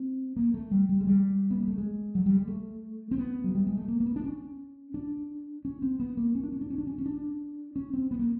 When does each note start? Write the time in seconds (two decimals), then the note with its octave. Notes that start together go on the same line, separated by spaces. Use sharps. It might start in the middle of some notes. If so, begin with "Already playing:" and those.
Already playing: C4
0.37 A#3
0.54 A3
0.71 G3
0.89 G3
1.01 G#3
1.07 G3
1.51 B3
1.60 A#3
1.68 A3
1.78 G#3
2.15 F#3
2.26 G3
2.37 G#3
2.48 A3
3.11 C4
3.18 B3
3.44 F#3
3.55 G3
3.67 G#3
3.77 A3
3.88 A#3
4.00 A#3
4.06 B3
4.16 D4
4.24 C#4
4.94 D4
5.65 C#4
5.82 C4
6.00 B3
6.17 A#3
6.35 C#4
6.43 D4
6.52 C#4
6.61 D4
6.70 C#4
6.78 D4
6.87 C#4
6.98 C#4
7.06 D4
7.76 C#4
7.94 C4
8.11 B3
8.19 A#3